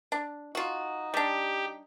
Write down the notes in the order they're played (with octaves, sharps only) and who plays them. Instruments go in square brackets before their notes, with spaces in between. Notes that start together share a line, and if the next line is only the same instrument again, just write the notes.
[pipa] D4
[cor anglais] D#4 [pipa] F4 F#4
[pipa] G3 D4 [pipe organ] G4